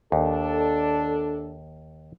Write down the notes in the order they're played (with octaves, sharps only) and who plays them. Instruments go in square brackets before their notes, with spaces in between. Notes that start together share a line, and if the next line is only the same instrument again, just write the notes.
[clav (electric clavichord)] D#2 [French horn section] D4 A4